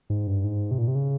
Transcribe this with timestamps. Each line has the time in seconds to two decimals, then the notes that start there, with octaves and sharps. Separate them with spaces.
0.10 G#2
0.27 G2
0.44 G#2
0.71 C3
0.78 A#2
0.88 C3
0.95 C#3